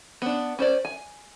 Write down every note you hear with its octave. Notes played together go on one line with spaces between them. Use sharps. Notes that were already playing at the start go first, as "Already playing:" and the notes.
B3 D4
C#4 C5 D5
G#5